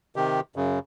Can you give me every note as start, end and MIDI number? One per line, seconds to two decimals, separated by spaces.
0.16 0.40 48
0.16 0.40 51
0.16 0.40 67
0.56 0.79 42
0.56 0.79 49